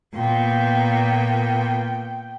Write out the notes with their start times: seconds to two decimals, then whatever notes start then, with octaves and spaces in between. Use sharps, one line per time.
0.15 A#2 B3 G5